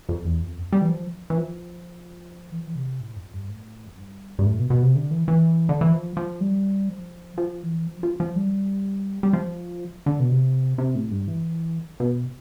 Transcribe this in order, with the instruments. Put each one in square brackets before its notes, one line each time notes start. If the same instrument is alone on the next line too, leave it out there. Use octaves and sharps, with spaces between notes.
[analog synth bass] F2
E2
F2
G3
E3
F3
E3
F3
E3
F3
E3
C3
A2
F2
G2
A2
F2
G2
G2
A2
B2
B2
C3
D3
E3
E3
D3
E3
F3
F3
G3
F3
F3
E3
F3
F3
F3
G3
G3
F3
D3
B2
C3
C3
A2
G2
E3
B2